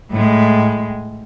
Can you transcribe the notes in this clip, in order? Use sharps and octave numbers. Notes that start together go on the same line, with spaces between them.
A2 G#3